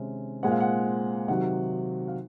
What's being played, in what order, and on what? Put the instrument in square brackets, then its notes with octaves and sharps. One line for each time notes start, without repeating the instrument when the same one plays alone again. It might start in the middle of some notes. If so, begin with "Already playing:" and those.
Already playing: [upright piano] C3 D#3 G#3 C#4
A#2 G#3 C4 F#5
F5
F#5
C3 D#3 F#3 F#5
F5